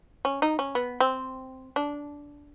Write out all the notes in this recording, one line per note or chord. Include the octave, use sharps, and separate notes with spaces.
C#4
D#4
C#4
B3
C4
D4